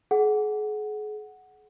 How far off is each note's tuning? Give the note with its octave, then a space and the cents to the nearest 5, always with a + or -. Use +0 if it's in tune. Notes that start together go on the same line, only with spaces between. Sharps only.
G#4 +35 F#5 +0